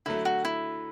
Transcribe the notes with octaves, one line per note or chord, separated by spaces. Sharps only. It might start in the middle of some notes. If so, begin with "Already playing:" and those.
D3 F#3 A3 E4
F#4
E4